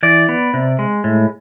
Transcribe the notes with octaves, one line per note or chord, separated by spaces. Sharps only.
E3 D5
B3
C3
G#3
A2